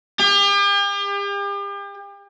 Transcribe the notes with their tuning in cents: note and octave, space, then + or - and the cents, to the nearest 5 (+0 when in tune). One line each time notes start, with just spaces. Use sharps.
G4 +40